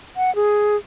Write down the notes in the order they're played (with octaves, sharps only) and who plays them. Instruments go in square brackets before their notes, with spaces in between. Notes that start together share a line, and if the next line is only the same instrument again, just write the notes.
[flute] F#5
G#4